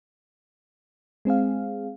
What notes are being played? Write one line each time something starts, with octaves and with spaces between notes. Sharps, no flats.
G#3 C4 G#4 F5